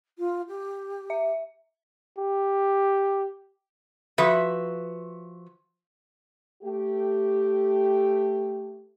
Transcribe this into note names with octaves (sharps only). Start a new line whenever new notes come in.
F4
G4
E5
G4
F3 F#4 B4 E5
A3 G4